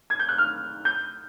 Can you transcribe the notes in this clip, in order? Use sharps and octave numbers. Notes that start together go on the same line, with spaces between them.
G#6
G6
F#6
F6
G6